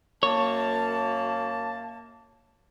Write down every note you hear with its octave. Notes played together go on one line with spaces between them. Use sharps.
F#2 A#3 C#5 A5